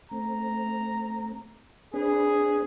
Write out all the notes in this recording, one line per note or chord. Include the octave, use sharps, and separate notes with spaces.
A3 C4 A#5
C4 D4 G#4 B4